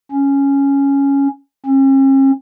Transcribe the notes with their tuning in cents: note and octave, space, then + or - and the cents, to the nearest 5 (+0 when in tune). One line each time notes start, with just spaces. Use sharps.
C#4 +0
C#4 -45